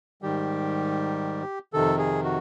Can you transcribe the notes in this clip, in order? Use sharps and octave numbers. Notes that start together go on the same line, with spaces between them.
G#2 D#3 G3 G4
F2 C3 D#3 A4
G#4
F#4